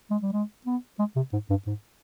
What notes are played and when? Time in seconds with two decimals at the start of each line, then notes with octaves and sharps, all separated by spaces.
0.10 G#3
0.22 G3
0.33 G#3
0.66 B3
0.99 G#3
1.16 C3
1.33 G#2
1.50 G2
1.66 G#2